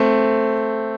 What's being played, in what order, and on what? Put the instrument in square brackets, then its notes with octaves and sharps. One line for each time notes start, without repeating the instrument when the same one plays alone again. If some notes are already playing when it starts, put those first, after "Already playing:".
Already playing: [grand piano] A3 C4